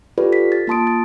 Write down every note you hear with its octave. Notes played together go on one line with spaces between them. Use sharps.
F4 G4 A4 B4 D5
B6
A6
A#3 F4 A5 C6 D#6 D7
A6